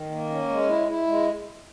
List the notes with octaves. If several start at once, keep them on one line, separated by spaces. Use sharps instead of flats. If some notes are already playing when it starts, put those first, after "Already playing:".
Already playing: D#3
A#3
C#4
G#3
E4
E4
G#3